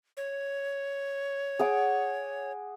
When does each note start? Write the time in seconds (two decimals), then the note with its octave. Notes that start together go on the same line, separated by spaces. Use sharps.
0.17 C#5
1.59 G#4 F#5 D6